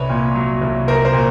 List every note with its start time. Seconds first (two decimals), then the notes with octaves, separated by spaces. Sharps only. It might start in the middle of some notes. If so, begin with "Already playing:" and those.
Already playing: C2 B4 C#5
0.09 A#2
0.35 F#3
0.61 C2
0.87 C2 A#4 C5
1.05 A#4 C5
1.14 A#2